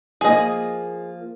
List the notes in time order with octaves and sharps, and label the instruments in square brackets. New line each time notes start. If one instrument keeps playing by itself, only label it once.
[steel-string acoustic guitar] F3 A#3 [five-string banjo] G#4 D#5